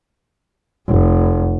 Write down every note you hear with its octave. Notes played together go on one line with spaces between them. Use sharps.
F1